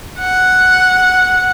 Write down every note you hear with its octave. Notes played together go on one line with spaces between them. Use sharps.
F#5